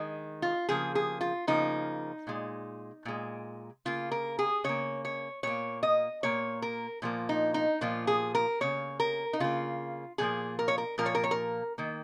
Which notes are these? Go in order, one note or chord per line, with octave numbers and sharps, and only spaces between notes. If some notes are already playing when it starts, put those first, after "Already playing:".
Already playing: D#3 G#3
F4
C#3 F3 A#3 G#4
G#4
F4
C#3 F3 A#3 D#4
A#2 G#3
A#2 G#3
C#3 A#3 F4
A#4
G#4
C#3 A#3 C#5
C#5
A#2 A#3 C#5
D#5
A#2 A#3 C#5
A#4
A#2 F3 A#3
D#4
D#4
A#2 F3 A#3 F4
G#4
A#4
C#3 A#3 C#5
A#4
D#4
C#3 A#3 F4
A#2 F3 A#3 G#4
A#4
C#5
A#4
A#2 F3 A#3 A#4
C#5
A#4
C#5
A#4
D#3 A#3